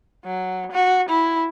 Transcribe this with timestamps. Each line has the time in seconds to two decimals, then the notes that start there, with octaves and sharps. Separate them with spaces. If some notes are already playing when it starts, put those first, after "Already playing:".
0.25 F#3
0.72 F#4
1.09 E4